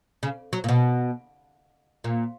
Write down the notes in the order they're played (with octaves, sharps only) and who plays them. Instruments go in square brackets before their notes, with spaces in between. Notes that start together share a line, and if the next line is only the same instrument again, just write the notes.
[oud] C#3
F#3
A#2
B2
A#2